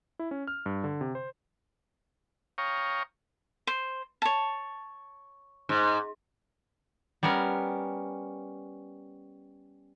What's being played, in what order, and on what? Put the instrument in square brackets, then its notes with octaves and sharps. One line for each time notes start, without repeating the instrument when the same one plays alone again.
[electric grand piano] E4
C#4
F6
G2
D3
C3
C5
[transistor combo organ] C#5 F5 G5 A#5 C#6 D#6
[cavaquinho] C5
C#5 A5
[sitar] G#2
[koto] G3 B3 C#4 A#4